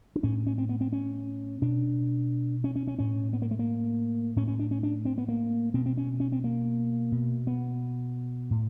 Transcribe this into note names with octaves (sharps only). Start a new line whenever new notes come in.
D4
A2 C#4
C#4
C4
B3
C4
C#4
B2 D4
C#4
C#4
C#4
A2 C#4
B3
A#3
A3
A#3
A2 C#4
C#4
D4
C#4
D4
C4
B3
A#3
B2 C4
C4
C#4
C#4
C4
A#3
B2
B3
A2